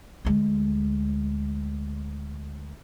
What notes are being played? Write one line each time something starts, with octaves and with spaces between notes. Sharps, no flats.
D2 G#3